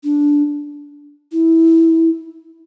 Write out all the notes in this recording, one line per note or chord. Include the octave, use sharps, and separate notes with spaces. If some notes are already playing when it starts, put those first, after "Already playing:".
D4
E4